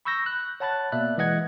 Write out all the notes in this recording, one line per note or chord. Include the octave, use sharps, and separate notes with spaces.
B5 C#6 E6 G6 A#6
F#6
C#5 F#5 A5 B5 F#6 A6
B2 A#3 D5 E5 F#6
E3 G#3 D#5 F#5 G#6